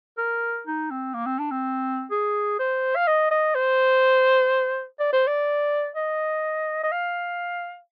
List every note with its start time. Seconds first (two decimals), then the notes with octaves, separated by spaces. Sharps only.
0.18 A#4
0.67 D#4
0.91 C4
1.14 A#3
1.26 C4
1.39 D4
1.51 C4
2.11 G#4
2.59 C5
2.96 F5
3.07 D#5
3.31 D#5
3.55 C5
5.00 D5
5.13 C5
5.27 D5
5.96 D#5
6.83 D#5
6.92 F5